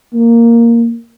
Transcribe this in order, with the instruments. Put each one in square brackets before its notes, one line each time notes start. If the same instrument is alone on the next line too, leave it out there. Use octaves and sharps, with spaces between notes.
[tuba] A#3